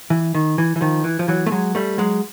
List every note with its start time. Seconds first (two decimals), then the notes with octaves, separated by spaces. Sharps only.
0.10 E3
0.35 D#3
0.58 E3
0.76 E3
0.81 D#3 F3
1.04 E3
1.19 F3
1.28 E3 F#3
1.46 A3
1.51 F#3 G#3
1.75 G3 A3
1.98 F#3 G#3